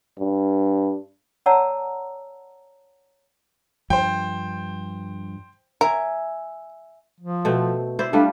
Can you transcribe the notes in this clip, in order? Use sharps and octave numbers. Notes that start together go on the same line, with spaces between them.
G2
C#5 D5 F#5 A5 A#5 E6
G2 F3 C5 G5
A#4 E5 G#5
F3
B2 A3 C4
E4 C5 D5
G3 A3 D4 F4